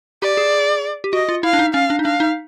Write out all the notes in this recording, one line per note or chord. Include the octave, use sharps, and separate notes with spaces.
G4 D5
G#4
G4
F#4 D#5
F4
E4 F5
D4
D#4
C#4 F5
D4
D#4
D4 F5
D#4